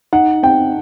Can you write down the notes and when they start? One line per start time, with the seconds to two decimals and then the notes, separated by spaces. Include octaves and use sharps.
0.13 D#4 F#5
0.43 C4 G5